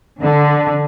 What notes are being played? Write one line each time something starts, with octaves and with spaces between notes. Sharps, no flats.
D3